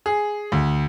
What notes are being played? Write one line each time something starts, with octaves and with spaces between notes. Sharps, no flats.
G#4
D2